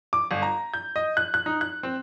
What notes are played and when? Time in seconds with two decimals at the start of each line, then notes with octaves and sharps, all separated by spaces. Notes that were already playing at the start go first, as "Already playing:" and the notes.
0.13 D6
0.31 G1
0.42 A#5
0.74 G6
0.96 D#5
1.17 F#6
1.34 F#6
1.46 D#4
1.61 F#6
1.83 C4